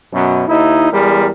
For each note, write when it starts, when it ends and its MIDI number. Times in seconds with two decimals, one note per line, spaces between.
0.13 0.44 42
0.13 0.44 47
0.48 0.90 39
0.48 0.90 63
0.48 0.90 64
0.91 1.27 40
0.91 1.27 55
0.91 1.27 56
0.91 1.27 70